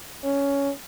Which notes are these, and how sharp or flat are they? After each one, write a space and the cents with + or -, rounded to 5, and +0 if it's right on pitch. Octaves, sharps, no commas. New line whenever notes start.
C#4 +10